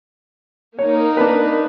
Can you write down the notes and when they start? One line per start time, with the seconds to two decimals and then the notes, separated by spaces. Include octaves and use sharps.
0.79 A#3 D#4 C#5
1.17 D4 B4